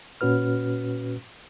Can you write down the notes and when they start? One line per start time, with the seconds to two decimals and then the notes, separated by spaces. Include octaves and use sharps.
0.21 A#2 C#4 F#4 B4 F6